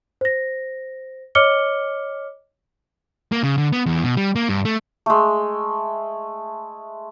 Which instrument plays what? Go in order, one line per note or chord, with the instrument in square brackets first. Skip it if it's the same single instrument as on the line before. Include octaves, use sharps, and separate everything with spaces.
[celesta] C5 A#6
C#5 D#5 D6 F6 C#7 G7
[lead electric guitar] A#3
C#3
D3
B3
E2
B2
G3
A#3
G2
A3
[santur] G#3 A3